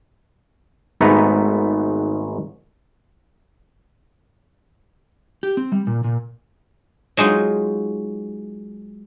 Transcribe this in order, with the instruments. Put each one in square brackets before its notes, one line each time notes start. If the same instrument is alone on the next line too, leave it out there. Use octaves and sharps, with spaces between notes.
[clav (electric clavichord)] G#1 G#2 A3 B3 B4 A#5
[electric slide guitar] G4
C4
G3
A#2
A#2
[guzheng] F#3 G#3 D#4 F4